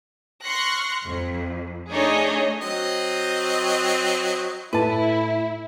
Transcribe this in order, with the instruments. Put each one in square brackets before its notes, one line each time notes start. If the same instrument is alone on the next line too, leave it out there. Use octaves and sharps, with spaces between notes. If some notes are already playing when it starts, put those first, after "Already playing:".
[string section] C6 C#6 F6 F#6 A#6 C#7
F2
A3 D4 D#4 G#4 C#5 D#5
[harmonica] F#3 C4 D#5
[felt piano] A2 [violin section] E4 [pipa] B4 A5